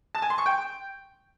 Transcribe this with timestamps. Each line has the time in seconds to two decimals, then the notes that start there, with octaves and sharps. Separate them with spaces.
0.15 A5
0.22 G#5
0.30 C6
0.38 C#6
0.46 G5